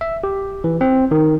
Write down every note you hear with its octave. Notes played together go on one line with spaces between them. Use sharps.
E5
G4
E3
C4
D#3